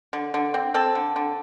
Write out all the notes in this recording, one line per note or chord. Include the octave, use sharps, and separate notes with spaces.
D3
D3
C4
C4 A4
D3
D3